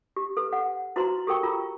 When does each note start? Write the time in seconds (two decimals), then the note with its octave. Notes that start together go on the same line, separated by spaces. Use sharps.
0.16 G4
0.37 A4 B4
0.53 F#5
0.96 E4 F#4 B4 C5 A#5 C6
1.27 G4 A4 A#4 G5 C#6
1.43 F4 A#5 E6